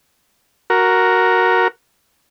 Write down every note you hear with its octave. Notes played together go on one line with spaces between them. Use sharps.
F#4 A#4